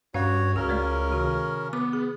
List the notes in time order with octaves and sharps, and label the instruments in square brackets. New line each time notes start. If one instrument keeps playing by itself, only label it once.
[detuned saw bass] G2 [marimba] C#4 F5 [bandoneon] F#4 C#5
[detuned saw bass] C#2 [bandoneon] C#3 C#4 A#4 [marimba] F#4
[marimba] G#3 A3 D5
C3 D#3 F#4
[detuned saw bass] B3 [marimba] D6
[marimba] G#4